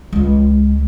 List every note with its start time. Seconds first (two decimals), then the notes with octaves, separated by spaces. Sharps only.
0.13 C#2 G#3